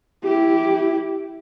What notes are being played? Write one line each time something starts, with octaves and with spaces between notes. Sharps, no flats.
E4 G4